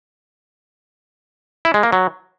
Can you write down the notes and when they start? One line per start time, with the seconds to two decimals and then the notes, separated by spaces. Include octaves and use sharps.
1.65 E4
1.74 G#3
1.83 A#3
1.92 F#3